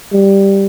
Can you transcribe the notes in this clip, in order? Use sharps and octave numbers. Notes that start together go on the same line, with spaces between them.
G3